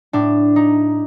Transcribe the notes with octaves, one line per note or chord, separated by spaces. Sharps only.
A2 D4
D#4